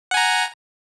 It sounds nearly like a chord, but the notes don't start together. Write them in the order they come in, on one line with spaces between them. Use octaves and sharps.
F#5 G#5 A#5